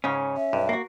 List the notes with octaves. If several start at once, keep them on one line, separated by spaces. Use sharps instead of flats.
G#2 C#3 C#4
E5
B1 G2
A#3 F#4